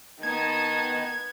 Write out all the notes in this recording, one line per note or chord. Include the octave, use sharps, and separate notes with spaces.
D#3 B3 D#4 A5 G#6